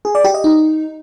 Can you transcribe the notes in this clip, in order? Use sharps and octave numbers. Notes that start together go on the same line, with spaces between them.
G#4
D5
G4
D#5
D#4